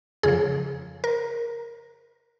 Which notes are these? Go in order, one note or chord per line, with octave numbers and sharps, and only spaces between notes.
F2 C#3 F3 G#4
A#4